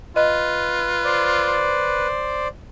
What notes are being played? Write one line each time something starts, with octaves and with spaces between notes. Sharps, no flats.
F4 B4 D#5
C5 D5